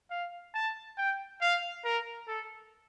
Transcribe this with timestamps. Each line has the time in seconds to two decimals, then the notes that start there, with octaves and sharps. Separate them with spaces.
0.11 F5
0.54 A5
0.98 G5
1.41 F5
1.85 A#4
2.28 A4